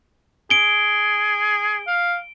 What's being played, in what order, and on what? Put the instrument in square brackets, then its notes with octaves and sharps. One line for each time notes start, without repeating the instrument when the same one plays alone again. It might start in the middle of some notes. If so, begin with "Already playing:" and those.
[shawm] G#4 [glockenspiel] D7 G7
[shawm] F5